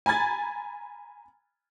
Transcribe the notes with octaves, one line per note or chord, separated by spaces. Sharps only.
G#5 A#5 B5 G#6 A6